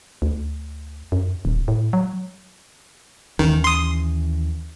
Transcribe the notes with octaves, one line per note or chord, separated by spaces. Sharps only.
D2
F#2
D#1
A2
F#3
D#2 D#3 E3 C#4
C6 D#6